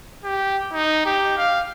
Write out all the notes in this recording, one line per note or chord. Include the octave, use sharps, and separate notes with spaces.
G4
D#4
G4
F5